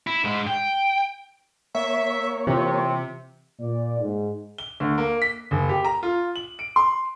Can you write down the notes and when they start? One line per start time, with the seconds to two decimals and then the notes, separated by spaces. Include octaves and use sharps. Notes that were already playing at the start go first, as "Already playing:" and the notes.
0.07 E4
0.24 G#2 G#3
0.47 G5
1.75 A#3 C#5 E5
2.47 C3 E3 C4 F4
3.60 A#2 D5
4.00 G#2
4.58 G7
4.80 D2
4.98 A#3
5.22 B6
5.51 F#1
5.69 G4
5.85 A#5
6.03 F4
6.36 F#7
6.59 D7
6.76 C6